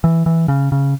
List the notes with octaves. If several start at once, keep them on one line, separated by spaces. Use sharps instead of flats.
E3
E3
C#3
C#3